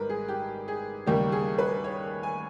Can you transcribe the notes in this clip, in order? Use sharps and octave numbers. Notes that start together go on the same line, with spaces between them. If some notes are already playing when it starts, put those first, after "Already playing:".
Already playing: G#1 G#2 G3 A#4 B4
G#4
G4
G#4
D#2 C#3 G3 A#3 G4
G#4
B4
C#5
G#5